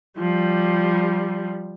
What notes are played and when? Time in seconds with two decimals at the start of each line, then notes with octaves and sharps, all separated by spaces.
0.18 F3 G3